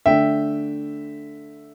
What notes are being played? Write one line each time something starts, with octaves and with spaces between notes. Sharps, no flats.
D3 A3 D4 E5 G5